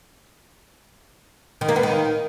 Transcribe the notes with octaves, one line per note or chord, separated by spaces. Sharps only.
D#3
A#3
B3
D#3